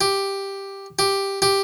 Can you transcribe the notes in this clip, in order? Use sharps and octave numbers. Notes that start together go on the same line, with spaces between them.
G4
G4
G4